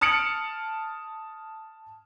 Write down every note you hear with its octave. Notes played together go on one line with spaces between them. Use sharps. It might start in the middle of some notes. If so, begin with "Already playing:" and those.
A5 D#6 F6 C#7 D7 F#7